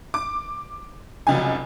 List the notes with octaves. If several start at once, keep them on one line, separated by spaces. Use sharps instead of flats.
D6
F1 C#2 F#3 G#5